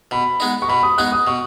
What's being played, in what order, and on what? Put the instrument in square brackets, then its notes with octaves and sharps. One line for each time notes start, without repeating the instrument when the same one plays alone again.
[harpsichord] B2 [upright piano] B5
[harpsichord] G#3 B3 D#4
[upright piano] C#6
[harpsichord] B2 [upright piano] B5
[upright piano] D#6
[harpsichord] G#3 B3 D#4 [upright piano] F#6
[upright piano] D#6
[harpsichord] B2 [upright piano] C#6